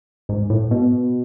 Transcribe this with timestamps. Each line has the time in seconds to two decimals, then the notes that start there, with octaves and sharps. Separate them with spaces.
0.29 G#2
0.50 A2
0.71 B2